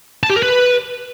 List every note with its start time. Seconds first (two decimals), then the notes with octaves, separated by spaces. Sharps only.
0.23 A5
0.30 G4
0.36 A#4
0.43 B4